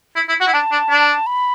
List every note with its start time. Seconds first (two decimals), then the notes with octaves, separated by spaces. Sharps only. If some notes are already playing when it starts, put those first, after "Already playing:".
0.16 E4
0.29 E4
0.40 F#4 F#5
0.47 E4
0.53 D4 A5
0.72 D4
0.90 D4
1.27 B5